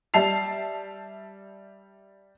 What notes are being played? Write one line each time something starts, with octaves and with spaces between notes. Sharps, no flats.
G3 E5 A5 C7 F7